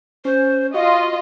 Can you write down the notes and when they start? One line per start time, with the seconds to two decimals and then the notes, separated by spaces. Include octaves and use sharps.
0.25 C#4 C5
0.74 F4 F#4 D#5 F5